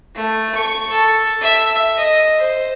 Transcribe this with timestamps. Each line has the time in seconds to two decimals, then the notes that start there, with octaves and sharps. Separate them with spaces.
0.15 A3
0.55 C#6
0.90 A4
1.41 E5
1.97 D#5
2.39 C5